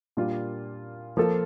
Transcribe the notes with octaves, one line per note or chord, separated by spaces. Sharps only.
A#2 G3 A#3 D4 F4
F3 A#3 F4 A4